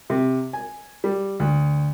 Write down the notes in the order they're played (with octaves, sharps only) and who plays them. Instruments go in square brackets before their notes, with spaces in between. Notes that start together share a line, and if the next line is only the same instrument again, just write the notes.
[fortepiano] C3
G#5
G3
D2